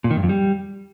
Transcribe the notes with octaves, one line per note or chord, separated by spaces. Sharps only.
A#2
D#3
G2
F2
G3